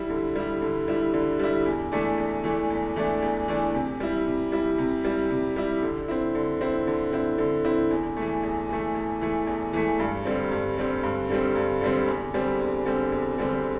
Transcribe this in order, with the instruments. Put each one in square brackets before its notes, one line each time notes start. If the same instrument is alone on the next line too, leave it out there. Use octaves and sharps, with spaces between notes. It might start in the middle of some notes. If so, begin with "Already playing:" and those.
Already playing: [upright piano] G3 E4
D3
G3 E4
D3
G3 E4
D3
G3 E4
E2
E3 A3 D4
E2
E3 A3 D4
E2
E3 A3 D4
E2
E3 A3 D4
C3
G3 E4
C3
G3 E4
C3
G3 E4
C3
G3 E4
D3
C4 E4
D3
C4 E4
D3
C4 E4
D3
C4 E4
E2
E3 A3
E2
E3 A3
E2
E3 A3
E2
E3 A3
G2
D3 G3 C4
G2
D3 G3 C4
G2
D3 G3 C4
G2
D3 G3 C4
E2
D3 G3 C4
E2
D3 G3 C4
E2
D3 G3 C4